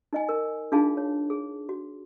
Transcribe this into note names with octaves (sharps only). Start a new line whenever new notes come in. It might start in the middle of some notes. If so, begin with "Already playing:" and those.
D#4 D#5 G#5
A#4
D4 D#4 F4 G#4 F5 A5
C#5
G#4
F#4